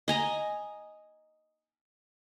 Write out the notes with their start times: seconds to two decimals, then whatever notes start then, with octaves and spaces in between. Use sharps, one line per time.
0.08 D#5 G#5 A#5